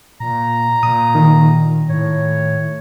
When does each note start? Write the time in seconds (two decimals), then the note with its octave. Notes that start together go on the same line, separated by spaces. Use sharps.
0.20 A#2 A#5
0.83 A#2 D#6
1.15 D#3
1.89 A2 C#5